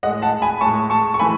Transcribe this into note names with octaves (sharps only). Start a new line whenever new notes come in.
A2 G#3 D#5 F#5
F#5 A5
G#5 B5
A2 G#3 A5 C#6
A5 C#6
C#6
E3 A3 G#5 B5